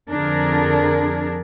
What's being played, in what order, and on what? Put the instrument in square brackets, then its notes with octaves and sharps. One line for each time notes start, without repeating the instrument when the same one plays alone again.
[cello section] F2 D3 D4 G#4 A#4